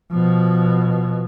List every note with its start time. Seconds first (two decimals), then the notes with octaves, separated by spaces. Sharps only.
0.12 B2 F3